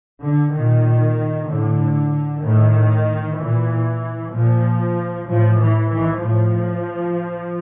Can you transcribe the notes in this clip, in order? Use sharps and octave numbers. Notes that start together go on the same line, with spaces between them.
D3
A#2 D#3
A2 D3
A2 D#3
A#2 E3
A#2 F3
A2 F3
E3
E3
A2 F3